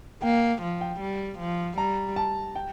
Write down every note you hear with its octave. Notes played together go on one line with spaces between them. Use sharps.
A#3 G5
F3
G5
G3
F3
G3 A#5
A5
G5